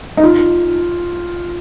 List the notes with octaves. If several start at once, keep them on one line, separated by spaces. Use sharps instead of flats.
D#4
F4